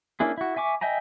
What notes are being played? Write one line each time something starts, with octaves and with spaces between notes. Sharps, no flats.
A#3 C#4 D4 E4 G#4
E4 F#4
E5 G#5 C#6 D6
D#5 E5 G5 G#5 A#5